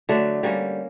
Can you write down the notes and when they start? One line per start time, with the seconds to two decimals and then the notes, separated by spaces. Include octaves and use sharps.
0.09 D3 F#3 A3 D4
0.43 D3 G3 A#3 C#4